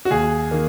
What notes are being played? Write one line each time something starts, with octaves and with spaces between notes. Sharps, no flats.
F#4
D#2 G#4
D#3 A#3